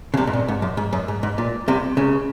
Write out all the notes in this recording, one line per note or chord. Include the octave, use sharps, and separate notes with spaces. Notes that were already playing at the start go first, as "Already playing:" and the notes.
C#3
C2 C3
G#2
A#2
G#2
F#2
G#2
F#2
G#2
G#2
A#2
C2 C3
C#2 C#3